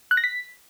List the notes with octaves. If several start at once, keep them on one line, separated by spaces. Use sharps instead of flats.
F#6
A#6
B6